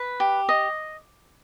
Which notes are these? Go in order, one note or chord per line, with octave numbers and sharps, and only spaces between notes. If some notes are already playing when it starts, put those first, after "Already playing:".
Already playing: B4
G4
D#5